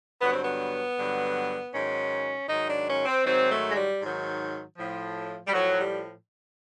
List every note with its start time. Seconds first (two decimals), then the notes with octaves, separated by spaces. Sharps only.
0.21 G2 D3 F#3 B3
0.32 C4
0.43 B3
0.97 G2 D3 F#3
1.73 G#2 D#3 F#3 C#4
2.48 G#2 D#3 F#3 D#4
2.68 D4
2.87 C#4
3.06 C4
3.24 G#2 D#3 F#3 C4
3.50 A3
3.71 G#3
3.75 G3
4.00 G#2 D#3 F#3
4.76 A2 F3
5.47 G3
5.52 A2 F3 F#3
5.78 G3